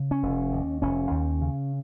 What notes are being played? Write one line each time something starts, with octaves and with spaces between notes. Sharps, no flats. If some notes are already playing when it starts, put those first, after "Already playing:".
Already playing: C#3
C#4
F1
D#2
F1 C#4
D#2
C#3